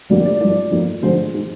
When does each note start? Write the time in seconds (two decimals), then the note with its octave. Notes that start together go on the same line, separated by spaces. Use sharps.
0.10 F1 F2 D3 G3 A#3 D5
0.25 D5
0.40 G#1 G2 F3 D5
0.71 F2 D#3 A#3
1.03 F1 F2 D3 G#3 C5
1.34 D#3 G#3